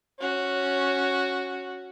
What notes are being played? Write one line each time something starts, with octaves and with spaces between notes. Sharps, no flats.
C#4 F#4